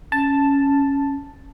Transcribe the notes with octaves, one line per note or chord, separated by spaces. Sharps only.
C#4 A5